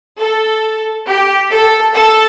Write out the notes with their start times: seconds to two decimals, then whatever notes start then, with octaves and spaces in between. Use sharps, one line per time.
0.19 A4
1.06 G4
1.50 A4
1.94 A4